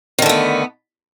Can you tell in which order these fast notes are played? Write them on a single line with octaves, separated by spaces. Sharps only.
D#3 D3 A3 B3